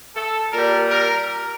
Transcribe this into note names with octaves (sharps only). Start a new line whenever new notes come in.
A4
A#2 G3 A#4
A#4